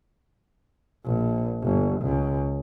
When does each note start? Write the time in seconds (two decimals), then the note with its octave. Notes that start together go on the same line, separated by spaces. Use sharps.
1.06 A#1
1.63 G1
2.02 C#2